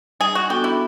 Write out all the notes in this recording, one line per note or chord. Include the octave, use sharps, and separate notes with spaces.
G3 G#4
F#4
B3 D4 F#4 G4 A4
E4